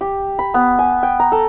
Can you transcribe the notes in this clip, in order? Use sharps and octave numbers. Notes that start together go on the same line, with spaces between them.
G4
B5
B3
G#5
G5
A#5
A4